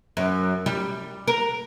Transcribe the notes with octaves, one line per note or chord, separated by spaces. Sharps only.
F#2
G3
A#4